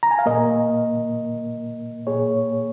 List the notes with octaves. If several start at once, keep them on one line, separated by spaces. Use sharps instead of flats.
A#5
G#5
F5
A#2 A#3 A#4 D#5
A#2 A#3 G#4 C#5